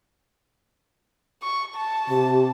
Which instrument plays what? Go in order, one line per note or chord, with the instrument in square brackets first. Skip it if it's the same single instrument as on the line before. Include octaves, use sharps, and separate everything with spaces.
[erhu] C#6
A5
[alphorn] C3 [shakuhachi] G4